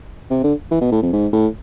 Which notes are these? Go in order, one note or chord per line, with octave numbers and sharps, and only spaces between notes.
C3
D3
E3
B2
A2
F2
G#2
A2